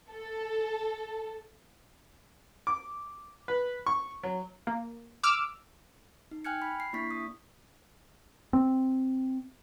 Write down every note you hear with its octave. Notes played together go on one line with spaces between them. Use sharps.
A4
D6
B4
C#6
F#3
A#3
D6 E6 F6
D#4
G5 G#5 F6 F#6 G#6 C#7
B5
C7
A#3 D4 E4 C#6 B6
D#6
C4